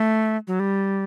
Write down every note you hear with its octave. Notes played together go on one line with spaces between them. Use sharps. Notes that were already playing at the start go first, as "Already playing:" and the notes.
Already playing: A3
F#3
G3